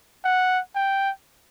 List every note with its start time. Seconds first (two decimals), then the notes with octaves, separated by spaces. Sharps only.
0.25 F#5
0.75 G5